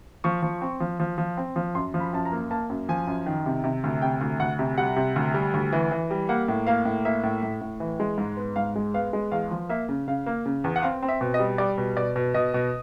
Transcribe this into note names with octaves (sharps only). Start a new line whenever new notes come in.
F3 C#6
F3
C4
F3
F3
F3
C4
F3
F#2 C6
F3
B5
F#2 A5
A#5
A#3
A#3 A5
F#2
F3 G#5
F#2
D#3
C3
C3
D2
C3 G5
D2
D2 F#5
C3
G3 F#5
C3
D2
G3
D2
E3
E3
G3
A#3 F#5
A2
A#3 F5
A2
A#3 E5
A2
A2
A2
E3
G#3
G#2
B3
G#2 F5
G#3
B3 F5
G#3
E2 F5
F3
A#3 E5
C#3
C#3 F5
A#3
C#3
E2
F#5
C4 F5
C4
E5
B2
D#5
G3
G3 D5
B2
B2 D5
B2
B2 D#5
B2